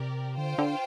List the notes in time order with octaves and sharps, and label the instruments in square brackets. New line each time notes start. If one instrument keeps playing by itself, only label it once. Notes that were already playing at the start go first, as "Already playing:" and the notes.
Already playing: [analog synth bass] C3 [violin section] G4 A#4 D5
[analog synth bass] D3 [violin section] F4 C5 G5
[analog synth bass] D3